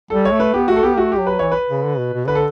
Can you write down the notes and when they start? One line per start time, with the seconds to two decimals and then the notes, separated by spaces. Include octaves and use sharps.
0.10 G3 A4
0.25 C#5
0.32 A3
0.40 B4
0.54 B3 G4
0.68 A3 F#4
0.76 A4
0.83 B3 G4
0.97 A3 F#4
1.12 G4
1.19 F#3
1.27 B4
1.39 E3 C#5
1.52 B4
1.70 C#3
1.84 D3
1.98 B2
2.13 B2
2.27 D3 B4
2.35 A4